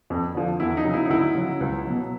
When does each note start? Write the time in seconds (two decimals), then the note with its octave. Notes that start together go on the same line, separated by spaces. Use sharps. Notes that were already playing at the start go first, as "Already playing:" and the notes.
0.10 F2
0.35 D3 F3
0.60 E2 E4
0.77 D#4
0.85 C#3 F#3
0.94 E4
1.05 D#4
1.10 D2 E4
1.35 C#3 F#3
1.61 C#2
1.85 B2 F#3